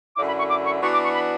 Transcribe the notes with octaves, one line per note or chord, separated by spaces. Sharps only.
F#2 D3 A3 E4 D6
B5
C#6
D6
C#6
E3 B3 D4 F#4 C#6
D6
C#6
B5